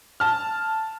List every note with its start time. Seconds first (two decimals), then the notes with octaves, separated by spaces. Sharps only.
0.20 A5 F6